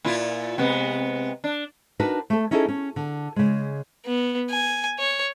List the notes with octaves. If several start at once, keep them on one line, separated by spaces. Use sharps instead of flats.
A#2 E4 F4
C3 G#3 B3
D4
D4 D#4 F#4 A#4 B4
A3 A4
C#4 D#4 E4 G#4 A4 D#5
C#4
D3
C#3 G#3
B3
G#5
C#5